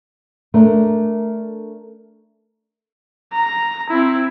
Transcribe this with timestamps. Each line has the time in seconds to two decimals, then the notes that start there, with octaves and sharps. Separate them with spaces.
0.54 A3 D4 A#4
3.33 A#5
3.90 C4 E4